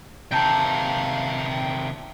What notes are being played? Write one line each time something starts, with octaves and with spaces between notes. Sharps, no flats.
C3 D#3 F5 G5 A5 A#5 G6